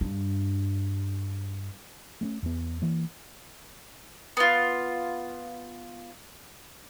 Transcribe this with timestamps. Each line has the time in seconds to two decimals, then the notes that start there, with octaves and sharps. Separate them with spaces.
0.01 G2 D4
2.21 A3 B3 C#4
2.43 E2 B3
2.82 E3 A#3
4.37 B3 F4